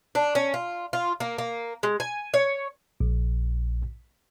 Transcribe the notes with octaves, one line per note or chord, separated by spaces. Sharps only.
D4
C#4
F4
F4
A#3
A#3
G#3
G#5
C#5
A#1